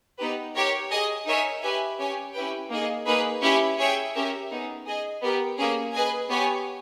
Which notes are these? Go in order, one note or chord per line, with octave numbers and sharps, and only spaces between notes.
B3 D#4 G4 B4
G4 A#4 C#5
G#4 D#5 G#5
D#4 A#4 C#5 E5 G#5
G4 B4 E5 G#5
C#4 G4 C#5 G#5
C#4 E4 G4 B4 G5
A#3 D#4 G#4 D#5
A#3 D#4 G#4 B4
C#4 E4 G4 C#5 E5
G#4 C#5 E5 G5
C#4 G4 A#4 E5
B3 D#4 G#4
G#4 D#5 G#5
B3 G4 A#4
A#3 C#4 G#4
G#4 B4 D#5 G#5
B3 G4 C#5 G#5